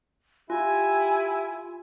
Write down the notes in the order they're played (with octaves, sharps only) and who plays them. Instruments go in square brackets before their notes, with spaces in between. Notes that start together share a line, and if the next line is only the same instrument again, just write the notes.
[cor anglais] E4 [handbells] F4 [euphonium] G4 [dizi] G#5